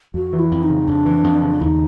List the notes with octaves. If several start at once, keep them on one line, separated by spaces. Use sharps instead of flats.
F2 F#4
E3
E4
F2
D#4
C#3
F2 D4
E3
F2
C#3
D#2 D#4 E4